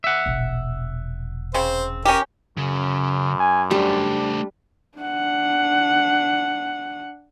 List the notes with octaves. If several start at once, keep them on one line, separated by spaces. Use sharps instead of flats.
E5 F#5
E1 A#1
C#3 C4 C5
C#4 G4 A#4
F#2 C#3
G#5
G3 A3 D4 C5
D4 F#5